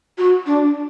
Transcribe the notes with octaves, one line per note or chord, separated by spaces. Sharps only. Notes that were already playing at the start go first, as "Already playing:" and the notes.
F#4
D4